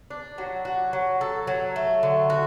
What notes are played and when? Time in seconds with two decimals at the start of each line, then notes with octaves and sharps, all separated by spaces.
0.10 D4
0.38 F#3
0.65 F#4
0.93 F#3
1.21 A4
1.47 F#3
1.76 A3
2.03 D3
2.30 F#4